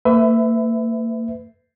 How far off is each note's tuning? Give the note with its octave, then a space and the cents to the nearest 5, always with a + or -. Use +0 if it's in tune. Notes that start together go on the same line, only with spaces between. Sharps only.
A#3 -40 B4 +30 E5 +0